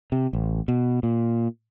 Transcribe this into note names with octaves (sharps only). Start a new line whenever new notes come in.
C3
A1
B2
A#2